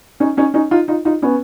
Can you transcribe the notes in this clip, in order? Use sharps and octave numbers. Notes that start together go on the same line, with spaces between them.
C#4 D#4
C#4 D#4
C#4 D#4
D#4 F4
D#4 F4
D#4 F4
B3 C#4